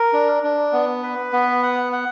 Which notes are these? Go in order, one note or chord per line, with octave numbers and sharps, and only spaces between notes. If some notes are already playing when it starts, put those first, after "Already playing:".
Already playing: A#4
D4
D4
B3
B4
B3
F#5
F#5